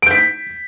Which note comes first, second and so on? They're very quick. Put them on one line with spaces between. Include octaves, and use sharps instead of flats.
D7 G6 B6